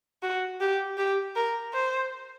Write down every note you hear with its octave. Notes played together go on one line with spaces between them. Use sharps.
F#4
G4
G4
A#4
C5